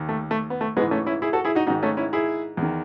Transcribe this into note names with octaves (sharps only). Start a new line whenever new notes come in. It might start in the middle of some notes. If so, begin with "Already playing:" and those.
Already playing: D#2 D#3
A3
A3
B3
A3
G#2 E3 G#3 B3
A3 C#4
C#4 E4
E4 G#4
F#4 A4
E4 G#4
D#4 F#4
G#2 D#3 D#4 F#4
A3 C#4
C#4 E4
E4 G#4
E2
D#3